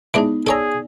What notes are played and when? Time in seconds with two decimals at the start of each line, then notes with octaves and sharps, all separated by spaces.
0.14 E3 G#3 B3 D4 D#4
0.47 G#4 A4 C#5 D5 G#5 A#5 E6